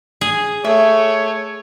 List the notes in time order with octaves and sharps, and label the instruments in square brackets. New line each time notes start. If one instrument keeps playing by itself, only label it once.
[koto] G#4
[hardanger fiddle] A3 [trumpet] C#5 [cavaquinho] E5